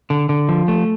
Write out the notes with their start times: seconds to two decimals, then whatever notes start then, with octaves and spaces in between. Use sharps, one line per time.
0.10 D3
0.29 D3
0.49 F3
0.68 A3